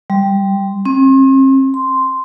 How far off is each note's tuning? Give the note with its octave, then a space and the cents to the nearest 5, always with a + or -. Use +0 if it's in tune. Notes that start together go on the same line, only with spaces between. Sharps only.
G3 +5
C4 +40
C6 -5